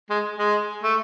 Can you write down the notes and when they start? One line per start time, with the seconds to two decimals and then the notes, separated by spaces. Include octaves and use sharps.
0.10 G#3
0.39 G#3
0.84 A3